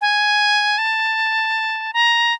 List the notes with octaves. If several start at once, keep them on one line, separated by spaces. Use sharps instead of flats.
G#5
A5
A#5